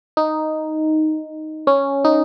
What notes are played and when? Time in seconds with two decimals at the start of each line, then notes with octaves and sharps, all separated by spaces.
0.17 D#4
1.67 C#4
2.05 D#4